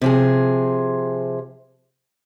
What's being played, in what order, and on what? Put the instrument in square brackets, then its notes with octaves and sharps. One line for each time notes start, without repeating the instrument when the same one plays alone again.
[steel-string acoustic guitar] C3 F3 G#4